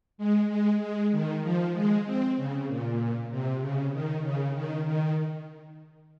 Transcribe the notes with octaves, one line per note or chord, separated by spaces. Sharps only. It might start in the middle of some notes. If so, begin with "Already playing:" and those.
G#3
G#3
G#3
D#3
F3
G#3
C4
C#3
A#2
C3
C#3
D#3
C#3
D#3
D#3